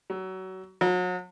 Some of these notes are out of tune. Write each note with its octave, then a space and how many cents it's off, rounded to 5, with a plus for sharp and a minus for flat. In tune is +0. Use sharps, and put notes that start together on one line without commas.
F#3 +25
F#3 -35